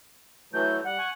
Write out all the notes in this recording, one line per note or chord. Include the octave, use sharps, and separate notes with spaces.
E3 F#3 A3 G6
G3 F#5
G#5 C#6